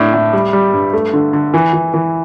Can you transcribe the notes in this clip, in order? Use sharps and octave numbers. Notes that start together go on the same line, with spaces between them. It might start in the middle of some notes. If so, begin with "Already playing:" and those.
Already playing: A2 D4
A2
G3
G3
G2
A3
D3
D3
E3
E3
E3